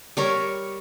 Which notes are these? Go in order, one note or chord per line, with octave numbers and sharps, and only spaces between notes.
G3 A#4 C#5